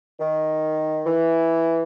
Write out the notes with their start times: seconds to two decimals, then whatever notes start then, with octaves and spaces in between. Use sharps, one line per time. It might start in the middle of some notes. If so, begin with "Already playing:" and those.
0.18 D#3
1.06 E3